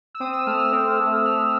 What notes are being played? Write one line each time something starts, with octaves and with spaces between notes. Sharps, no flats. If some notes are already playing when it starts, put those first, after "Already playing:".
E6
C4 D#6
E6
A3 F6
F6
C4
A3
A3 F6